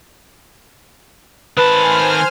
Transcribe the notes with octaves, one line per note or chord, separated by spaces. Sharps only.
D#3 B4 C5 G#5 A5 B5 F6 F#6